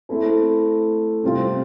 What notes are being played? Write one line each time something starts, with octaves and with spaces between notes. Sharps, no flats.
A3 C4 E4 A4
C3 G3 C4 F4